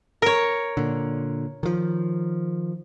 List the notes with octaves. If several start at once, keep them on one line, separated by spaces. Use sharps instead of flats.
A#4 C#5
A#2 D3
D#3 F3